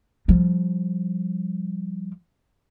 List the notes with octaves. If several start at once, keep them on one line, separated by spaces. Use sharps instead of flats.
F3 G3